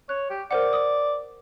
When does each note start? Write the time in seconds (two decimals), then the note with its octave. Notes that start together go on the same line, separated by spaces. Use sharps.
0.09 C#5 F#6
0.30 G4
0.51 A#4 C5 D5 F#5
0.73 D#6